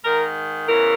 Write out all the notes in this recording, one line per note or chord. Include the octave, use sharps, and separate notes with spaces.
G#2 D#3 A#4
E2 C#3 E3 A#4